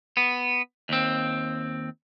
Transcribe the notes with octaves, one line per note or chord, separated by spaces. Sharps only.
B3
D#2 C4